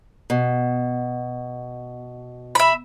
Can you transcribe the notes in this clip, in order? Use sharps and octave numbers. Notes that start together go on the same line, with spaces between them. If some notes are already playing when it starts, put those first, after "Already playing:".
B2
E5 B5